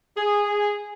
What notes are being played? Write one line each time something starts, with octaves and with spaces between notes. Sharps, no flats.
G#4